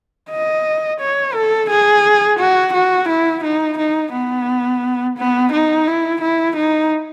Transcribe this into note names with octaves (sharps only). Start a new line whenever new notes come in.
D#5
C#5
A4
G#4
F#4
F#4
E4
D#4
D#4
B3
B3
D#4
E4
E4
D#4